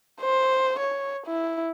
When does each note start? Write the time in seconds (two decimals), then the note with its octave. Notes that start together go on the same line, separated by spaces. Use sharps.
0.21 C5
0.80 C#5
1.27 E4